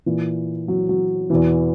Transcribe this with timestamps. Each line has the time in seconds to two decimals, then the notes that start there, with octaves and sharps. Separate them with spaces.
0.06 A#2 E3
0.68 F#3
0.89 F#3
1.30 E2 B2 E3